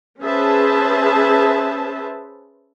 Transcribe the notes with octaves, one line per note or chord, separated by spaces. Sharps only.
C#4 G#4 B4 C5 E5 A5